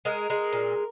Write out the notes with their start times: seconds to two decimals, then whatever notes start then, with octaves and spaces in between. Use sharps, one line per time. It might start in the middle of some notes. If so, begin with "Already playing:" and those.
0.05 G#3 A#4
0.30 G#3
0.52 A#2